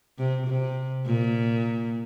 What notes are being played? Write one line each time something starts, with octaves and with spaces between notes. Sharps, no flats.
C3
C3
A#2